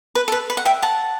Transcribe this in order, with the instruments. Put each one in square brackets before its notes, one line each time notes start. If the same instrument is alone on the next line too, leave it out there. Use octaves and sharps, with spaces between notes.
[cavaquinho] B4
A4
B4
B4
F#5
E5 G5
F#5 A5